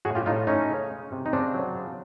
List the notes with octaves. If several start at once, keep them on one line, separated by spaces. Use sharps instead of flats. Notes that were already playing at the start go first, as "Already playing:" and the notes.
A2 F#4 G#4
F4 G4
A2 D#4 F4
A3 C#4 D#4
C#3
G#3
C3
D#4
C#3 C4 D4
F#3
C#3